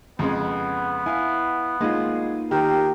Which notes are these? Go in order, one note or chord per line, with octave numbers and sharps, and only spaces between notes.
F2 C#3 G#3 B3
E4 F5 G#5
G#3 A#3 D#4 F4
D#3 G4 A#4